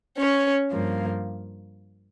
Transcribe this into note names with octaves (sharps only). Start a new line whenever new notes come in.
C#4 C#5
G2 F3 A#3